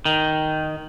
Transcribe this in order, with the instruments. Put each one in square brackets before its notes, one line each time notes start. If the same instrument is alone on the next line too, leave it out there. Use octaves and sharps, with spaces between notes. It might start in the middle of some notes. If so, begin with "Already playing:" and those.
[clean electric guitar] D#3